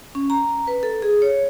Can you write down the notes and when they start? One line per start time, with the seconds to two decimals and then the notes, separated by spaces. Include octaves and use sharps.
0.15 C#4
0.30 A#5
0.67 B4
0.83 A4
1.02 G#4
1.22 C#5